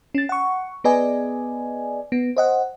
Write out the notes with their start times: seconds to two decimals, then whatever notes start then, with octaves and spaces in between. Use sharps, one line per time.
0.15 C#4 A6
0.29 F#5 C#6
0.84 B3 G#4 B4 D5 D#5 G#5
2.12 B3
2.37 C5 D#5 F#5